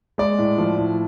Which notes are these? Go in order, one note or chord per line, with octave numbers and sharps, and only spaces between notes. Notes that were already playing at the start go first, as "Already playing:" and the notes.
G#3 D5
A2
F3
A2